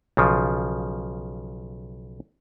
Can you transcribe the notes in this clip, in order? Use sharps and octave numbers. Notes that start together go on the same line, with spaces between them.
B1 C#3 F3